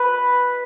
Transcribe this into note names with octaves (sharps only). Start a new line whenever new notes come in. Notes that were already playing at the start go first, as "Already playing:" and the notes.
Already playing: B4